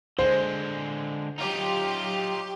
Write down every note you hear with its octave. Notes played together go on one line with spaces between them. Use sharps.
D3 G#3 C5
F#3 D#4 F4 G4